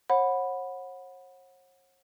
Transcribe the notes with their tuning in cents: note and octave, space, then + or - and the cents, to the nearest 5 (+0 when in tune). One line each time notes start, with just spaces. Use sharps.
C#5 -45 F#5 -15 B5 +0